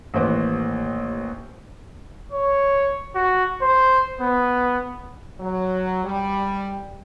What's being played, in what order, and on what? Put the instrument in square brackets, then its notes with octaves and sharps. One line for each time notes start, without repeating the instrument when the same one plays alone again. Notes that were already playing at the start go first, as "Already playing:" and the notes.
[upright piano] A1 D#2 B4 C5 D6
[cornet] C#5
F#4
C5
B3
[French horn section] F#3
G3